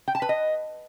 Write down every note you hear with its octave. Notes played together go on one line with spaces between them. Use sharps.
G5
A5
B4
D#5